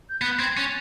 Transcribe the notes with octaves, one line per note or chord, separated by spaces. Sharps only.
G6
B3 F#6
C4 G#6
C#4 A6